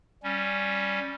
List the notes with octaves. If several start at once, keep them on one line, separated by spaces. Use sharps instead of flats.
G3 C#4